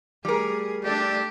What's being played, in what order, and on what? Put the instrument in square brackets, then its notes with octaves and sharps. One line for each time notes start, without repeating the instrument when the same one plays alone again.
[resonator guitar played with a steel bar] G3 A#4 [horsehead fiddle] A3 [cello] G#4
[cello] A3 D4 [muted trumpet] G4 [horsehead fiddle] A4 D5